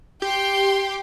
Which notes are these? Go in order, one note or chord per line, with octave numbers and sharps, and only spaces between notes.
G4 G5 C6